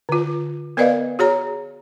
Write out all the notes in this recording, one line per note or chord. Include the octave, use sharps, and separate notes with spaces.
D3 F4
B3 A#4 B4 D5 D#5 F5
F#4 G#4 C#5 A#5